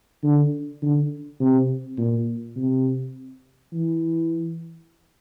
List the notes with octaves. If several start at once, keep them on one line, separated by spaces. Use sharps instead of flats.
D3
D3
C3
A#2
C3
E3